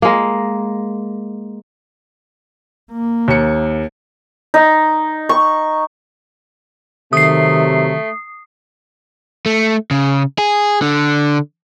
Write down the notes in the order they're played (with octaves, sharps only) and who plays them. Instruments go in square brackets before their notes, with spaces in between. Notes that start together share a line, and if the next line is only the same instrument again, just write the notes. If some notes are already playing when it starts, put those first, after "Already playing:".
[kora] G#3 A#3
[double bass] A#3
[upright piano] D#2 C#7
[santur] D#4
C#6
[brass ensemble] C3 F#3 [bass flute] D#3 [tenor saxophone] A3 [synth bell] D#6 C7
[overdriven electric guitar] A3
C#3
G#4
D3